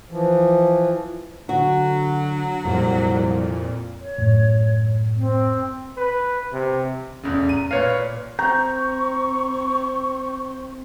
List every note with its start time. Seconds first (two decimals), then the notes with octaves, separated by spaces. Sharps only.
0.11 E3 F3
1.49 D3 F#3 F#4
2.64 C2 F2 A#2
3.99 C#5
4.18 F#2 A2
5.17 C4
5.97 B4
6.52 C3
7.23 F1 E2 C#3
7.49 A#5 D#7
7.71 A#2 B4 C#5 F5
8.39 C4 A#5 C#6 G6